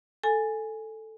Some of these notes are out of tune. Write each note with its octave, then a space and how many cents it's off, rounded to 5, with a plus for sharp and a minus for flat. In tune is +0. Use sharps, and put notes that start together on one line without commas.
A4 +0 G#5 +0